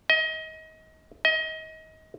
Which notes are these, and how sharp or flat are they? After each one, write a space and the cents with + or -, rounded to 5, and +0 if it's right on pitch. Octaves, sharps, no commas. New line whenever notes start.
D#5 +30
D#5 +30